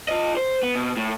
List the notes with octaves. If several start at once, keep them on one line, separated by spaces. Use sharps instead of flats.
F4 D#5
C5
B3
B2
A2